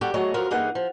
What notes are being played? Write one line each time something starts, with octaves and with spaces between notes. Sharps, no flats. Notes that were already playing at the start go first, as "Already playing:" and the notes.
G3 F#4 G4 A4
F#3 A3 G#4 C#5 D#5
F2 F#3 F4 A#4
G2 E3 A#3 D#4 G#4 F#5
F3